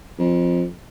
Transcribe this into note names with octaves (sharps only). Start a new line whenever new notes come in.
F2